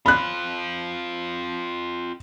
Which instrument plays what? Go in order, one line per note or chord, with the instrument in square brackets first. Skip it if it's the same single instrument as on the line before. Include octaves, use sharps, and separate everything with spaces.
[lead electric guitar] C4 F4 [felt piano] B5 F#6